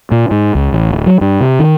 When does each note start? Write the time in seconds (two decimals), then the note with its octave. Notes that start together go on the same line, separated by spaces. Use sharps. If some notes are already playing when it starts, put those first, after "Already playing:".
0.11 A#2
0.31 G#2
0.55 C#2
0.72 A1
0.91 D1
1.06 F#3
1.21 G2
1.41 C3
1.60 D#3